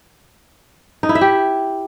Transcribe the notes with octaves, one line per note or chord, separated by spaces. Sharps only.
D#4
E4
E5
G4